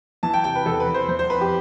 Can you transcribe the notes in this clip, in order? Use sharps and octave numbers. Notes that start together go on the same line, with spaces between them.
E3 A5
G5
C3 G5
B4
E2 A4
B4
E2
C5
E3 C5
C5
F2 B4
G4